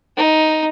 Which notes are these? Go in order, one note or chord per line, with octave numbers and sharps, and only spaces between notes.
D#4